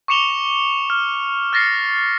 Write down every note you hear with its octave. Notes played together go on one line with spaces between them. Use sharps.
C#6 D6 C#7 E7 F7 G7
F6
F6 A6 A#6 C7 C#7